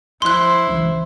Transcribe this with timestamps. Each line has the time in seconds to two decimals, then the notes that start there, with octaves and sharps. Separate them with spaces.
0.22 F3 E4 C5 C6 F#6
0.67 C#2 E3